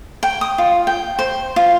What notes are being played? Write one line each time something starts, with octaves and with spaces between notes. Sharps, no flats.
G5
D#6
F4
G5
C5
F4